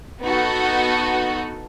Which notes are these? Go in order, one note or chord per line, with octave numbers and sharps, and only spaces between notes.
B3 D#4 F#4 A4